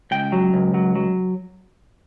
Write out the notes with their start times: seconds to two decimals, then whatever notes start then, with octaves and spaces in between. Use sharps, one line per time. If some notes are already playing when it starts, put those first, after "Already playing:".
0.11 C#2 G5
0.32 F#3
0.54 C#2
0.74 F#3
0.96 F#3